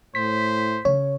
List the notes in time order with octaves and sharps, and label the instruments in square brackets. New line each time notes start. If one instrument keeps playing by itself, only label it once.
[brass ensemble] A2 [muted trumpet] C5 [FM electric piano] B6
[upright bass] C#3 [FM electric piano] C#5